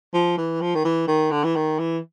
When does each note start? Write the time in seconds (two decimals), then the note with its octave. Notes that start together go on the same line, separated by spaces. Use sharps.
0.14 F3
0.37 E3
0.61 F3
0.75 D#3
0.84 E3
1.08 D#3
1.31 D3
1.44 E3
1.55 D#3
1.79 E3